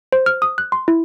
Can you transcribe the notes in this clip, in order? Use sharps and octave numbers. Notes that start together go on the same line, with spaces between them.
C5
F6
D#6
F#6
C6
E4